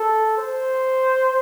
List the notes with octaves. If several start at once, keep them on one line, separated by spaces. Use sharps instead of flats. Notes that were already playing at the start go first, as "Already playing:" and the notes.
Already playing: A4
C5